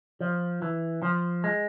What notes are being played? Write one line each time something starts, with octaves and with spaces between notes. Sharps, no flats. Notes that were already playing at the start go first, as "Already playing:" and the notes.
F3
E3
F3
G#3